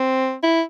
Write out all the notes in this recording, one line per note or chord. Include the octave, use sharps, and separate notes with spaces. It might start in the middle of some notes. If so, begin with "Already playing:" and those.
Already playing: C4
E4